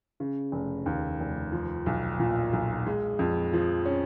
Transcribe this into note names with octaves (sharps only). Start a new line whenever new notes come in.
C#3
F1
D#2
F1
F3
B1
A#2
B1
G#3
F2
F3
C#4